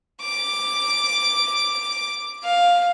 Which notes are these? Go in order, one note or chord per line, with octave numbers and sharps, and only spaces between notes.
D6
F5